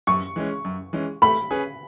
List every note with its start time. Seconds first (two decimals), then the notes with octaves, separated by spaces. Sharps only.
0.07 F#2 C#6
0.36 E3 G#3 C#4
0.65 F#2
0.93 E3 G#3 C#4
1.22 A3 B5
1.51 C#4 G#4 B4